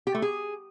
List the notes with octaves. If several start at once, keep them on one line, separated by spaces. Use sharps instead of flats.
G4
A3
G#4